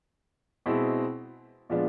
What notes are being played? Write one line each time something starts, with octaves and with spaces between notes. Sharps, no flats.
B2 G#3 C4 E4
A#2 F3 G#3 B3 D4